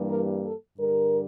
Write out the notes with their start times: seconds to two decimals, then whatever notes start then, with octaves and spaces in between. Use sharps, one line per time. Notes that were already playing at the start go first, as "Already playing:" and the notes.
Already playing: G2 E3 G3 A#3
0.11 A#4
0.44 A4
0.78 G2 D3 G3 A#4